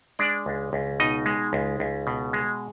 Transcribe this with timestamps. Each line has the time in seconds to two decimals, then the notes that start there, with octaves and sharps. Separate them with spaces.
0.19 G#3 D4 D5
0.46 C#2
0.73 C#2
1.00 B2 D#4 D#5
1.26 G#3
1.53 C#2
1.80 C#2
2.07 B2
2.33 G#3